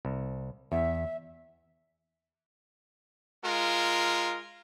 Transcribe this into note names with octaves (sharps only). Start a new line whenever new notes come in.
C2
E2 E5
G#3 F4 A#4